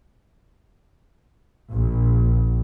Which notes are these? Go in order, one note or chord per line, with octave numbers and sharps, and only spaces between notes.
A#1